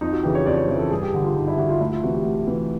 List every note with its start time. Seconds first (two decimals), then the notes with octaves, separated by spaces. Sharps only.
0.01 F2 D#4
0.13 F#4
0.23 C#3 E3 G4
0.35 C#5
0.46 F2 D5
0.57 C#5
0.68 C#3 E3 C5
0.79 A4
0.91 G2 G#4
1.03 G4
1.14 D3
1.24 F4
1.36 G2 D#4
1.47 E4
1.58 D3 F#4
1.69 F4
1.80 D2 E4
1.92 F4
2.02 C3 E3 F#4
2.14 G4
2.25 D2
2.47 C3 E3